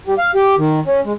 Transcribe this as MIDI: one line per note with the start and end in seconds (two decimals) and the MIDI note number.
0.07 0.14 55
0.18 0.31 77
0.35 0.55 67
0.58 0.80 51
0.87 1.00 61
1.05 1.13 56